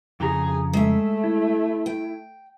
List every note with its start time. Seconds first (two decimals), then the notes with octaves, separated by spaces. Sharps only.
0.20 F2 C#3 G#4 A#5
0.73 G#3 A3 E5
1.24 E4
1.86 G5